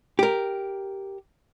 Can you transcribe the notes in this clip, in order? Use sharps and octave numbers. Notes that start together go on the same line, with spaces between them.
G4 A#4